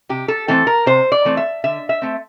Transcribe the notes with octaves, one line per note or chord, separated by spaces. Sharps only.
C3 G4
A4
E3 A3 C4 A4
A#4
C3 C5
D5
E3 A3 C4
E5
D3 E5
E5
A3 C4